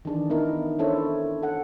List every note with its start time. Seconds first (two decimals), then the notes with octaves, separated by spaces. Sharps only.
0.05 D#3 E3 D4 G#4
0.30 B3 D#4 E4 A#4
0.79 C#4 D4 E4 A4 C5 C#5
1.42 A4 F#5